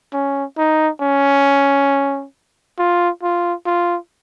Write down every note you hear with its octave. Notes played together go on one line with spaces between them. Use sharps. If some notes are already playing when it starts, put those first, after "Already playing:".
C#4
D#4
C#4
F4
F4
F4